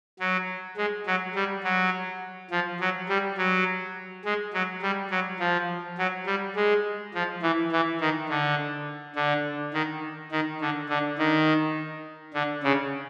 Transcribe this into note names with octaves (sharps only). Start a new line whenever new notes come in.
F#3
G#3
F#3
G3
F#3
F3
F#3
G3
F#3
G#3
F#3
G3
F#3
F3
F#3
G3
G#3
F3
E3
E3
D#3
D3
D3
D#3
D#3
D3
D3
D#3
D3
C#3